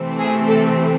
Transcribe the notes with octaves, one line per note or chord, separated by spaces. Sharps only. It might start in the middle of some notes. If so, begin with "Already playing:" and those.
Already playing: C3 E3 A3 C4
G#4
A4